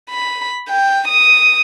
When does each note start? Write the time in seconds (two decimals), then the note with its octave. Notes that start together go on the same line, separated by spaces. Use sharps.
0.10 B5
0.69 G5
1.08 D#6